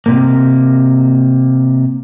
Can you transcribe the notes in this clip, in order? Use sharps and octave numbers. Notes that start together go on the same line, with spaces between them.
C3 A#3